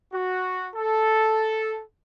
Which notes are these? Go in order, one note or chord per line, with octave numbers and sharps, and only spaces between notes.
F#4
A4